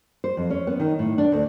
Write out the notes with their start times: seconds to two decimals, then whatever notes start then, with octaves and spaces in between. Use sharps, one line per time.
0.24 C5
0.37 F2
0.50 C#4
0.67 B3
0.80 D#3
0.99 A2
1.18 D4
1.32 D2